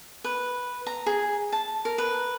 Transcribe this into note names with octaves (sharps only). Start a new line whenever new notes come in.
B4
A#5
G#4
A5
A#4
B4